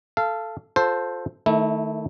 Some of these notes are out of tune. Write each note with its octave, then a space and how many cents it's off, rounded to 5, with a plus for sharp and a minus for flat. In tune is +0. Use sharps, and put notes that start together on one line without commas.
A4 +0 F5 -20
F4 +30 A4 +0 C5 +0
D#3 +0 A3 +0 E4 -25